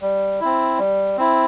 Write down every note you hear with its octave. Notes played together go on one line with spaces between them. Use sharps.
G3
C4 E4
G3
C4 E4